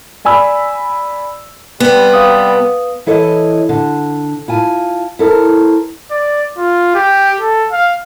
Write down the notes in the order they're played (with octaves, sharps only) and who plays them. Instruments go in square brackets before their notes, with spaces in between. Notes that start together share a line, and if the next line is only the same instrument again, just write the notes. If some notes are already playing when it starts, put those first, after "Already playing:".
[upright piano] D5 G#5 B5 E6
[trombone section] C3 G3 [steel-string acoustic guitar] B3
[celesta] B4 F5 D#6
[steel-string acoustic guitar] E3 E4 A4 C#5 D#5
D3
E4 F4 G#5 A5
E4 A4 A#4 C5
[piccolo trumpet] D5
F4
G4
A4
F5